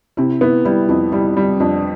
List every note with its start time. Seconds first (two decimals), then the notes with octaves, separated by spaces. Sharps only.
0.17 C3 E4
0.41 B3 E4
0.65 G3 E4
0.89 F2 E4
1.12 G3 E4
1.37 G3
1.60 F2 D4